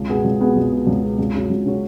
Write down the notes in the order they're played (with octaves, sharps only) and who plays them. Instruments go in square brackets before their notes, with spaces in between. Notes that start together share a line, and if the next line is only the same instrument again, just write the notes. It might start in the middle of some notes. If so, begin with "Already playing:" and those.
Already playing: [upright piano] C#2
B2 B3 G#4
C#2
B2 B3 G#4
C#2
B2 B3 G#4
C#2
B2 B3 G#4
C#2
C#3 F#3 C#4 F#4
C#2
C#3 F#3 C#4 F#4